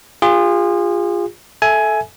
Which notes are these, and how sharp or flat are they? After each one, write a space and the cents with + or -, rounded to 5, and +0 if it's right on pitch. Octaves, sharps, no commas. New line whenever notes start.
F4 +0 G#4 -35
A4 -10 E5 +0 G#5 +15